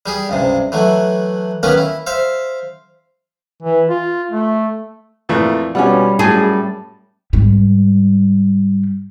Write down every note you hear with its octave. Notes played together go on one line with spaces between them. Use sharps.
G3 G4 G#4
C#2 G2 C3
E3 F#3 A3
D#3 A#3 B3 C#4 A#4 B4
E4
C5 E5 F5
E3
F4
A3
F2 A#2 E3 A3
B2 G3 C#4 F4 F#5 G#5
F#2 A2 G#4 A5
G#2 G3